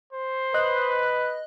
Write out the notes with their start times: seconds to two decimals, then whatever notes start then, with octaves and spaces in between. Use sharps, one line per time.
0.13 C5
0.54 B4 D#5 F#6